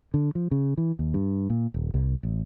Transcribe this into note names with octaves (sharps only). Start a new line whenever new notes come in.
D3
F3
C#3
E3
D#2
G2
A#2
D#1
C2
A1